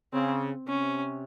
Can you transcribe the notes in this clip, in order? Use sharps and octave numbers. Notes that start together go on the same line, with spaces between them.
C#3 C4
C3 C#4